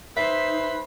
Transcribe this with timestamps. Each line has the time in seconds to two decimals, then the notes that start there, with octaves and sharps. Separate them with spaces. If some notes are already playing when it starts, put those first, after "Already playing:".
0.17 D#4 B4 C5 E5